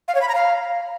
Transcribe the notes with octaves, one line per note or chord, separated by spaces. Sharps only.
F5
C#5
B5
A#5
F5